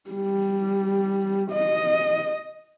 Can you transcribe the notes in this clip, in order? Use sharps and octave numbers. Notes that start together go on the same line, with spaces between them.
G3
D#5